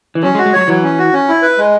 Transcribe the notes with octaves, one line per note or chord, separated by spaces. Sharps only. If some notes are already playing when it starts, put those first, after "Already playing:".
E3
F#3 C#4
G#3
F#4
G#3
F#3 C#5
E3 F#3
C#4
F#4
C#4
E4
B4
G#3